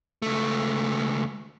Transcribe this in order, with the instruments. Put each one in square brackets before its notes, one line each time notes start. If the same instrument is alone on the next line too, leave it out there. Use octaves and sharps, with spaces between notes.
[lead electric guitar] C#2 A3